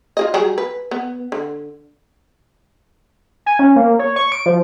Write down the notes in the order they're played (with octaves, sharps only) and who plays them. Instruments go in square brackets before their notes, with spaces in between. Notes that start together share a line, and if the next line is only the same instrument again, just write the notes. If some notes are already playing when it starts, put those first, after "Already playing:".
[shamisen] F4 G#4 D#5
F#3 G3 G#4
B4
B3
D3
[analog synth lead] G#5
C#4
A#3
C#5
C#6
D7
F3